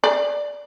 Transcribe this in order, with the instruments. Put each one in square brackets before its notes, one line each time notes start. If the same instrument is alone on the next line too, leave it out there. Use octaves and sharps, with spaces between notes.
[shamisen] D5